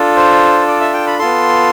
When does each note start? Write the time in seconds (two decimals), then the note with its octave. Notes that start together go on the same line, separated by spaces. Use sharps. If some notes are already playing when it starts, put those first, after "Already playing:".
Already playing: D4 F4 A4
0.16 C5
0.68 D5
0.81 E5
0.94 G5
1.06 B5
1.19 B3 F4 A4 C6